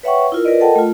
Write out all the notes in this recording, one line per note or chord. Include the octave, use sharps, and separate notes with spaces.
B4 C#5 E5 F#5 G5 C#6
E4 F4 A#4
F4 A#4 B4 D5 D#5
A4 A#4 D#5 F#5 G5 A5
A3 F4